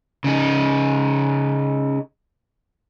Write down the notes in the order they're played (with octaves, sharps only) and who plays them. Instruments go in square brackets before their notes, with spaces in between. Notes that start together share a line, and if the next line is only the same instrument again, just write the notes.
[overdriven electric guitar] C#3 D#4